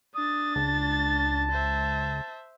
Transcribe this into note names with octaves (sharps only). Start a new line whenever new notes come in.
D4 D#6 A6
C#2 A5
C5 E5